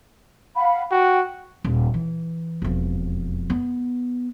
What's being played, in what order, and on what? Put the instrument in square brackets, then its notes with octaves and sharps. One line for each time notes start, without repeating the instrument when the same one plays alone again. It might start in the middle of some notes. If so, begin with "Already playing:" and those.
[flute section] F5 F#5 B5
[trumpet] F#4 [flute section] G5
[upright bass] D#1
E3
E1 F2
B3